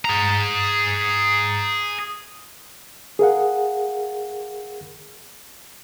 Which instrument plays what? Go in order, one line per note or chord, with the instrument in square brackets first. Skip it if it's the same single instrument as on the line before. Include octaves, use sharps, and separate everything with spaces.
[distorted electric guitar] G#4 A#5
[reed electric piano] G#4 A#4 F5 F#5